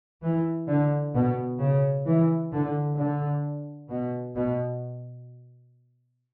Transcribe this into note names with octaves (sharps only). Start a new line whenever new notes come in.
E3
D3
B2
C#3
E3
D3
D3
B2
B2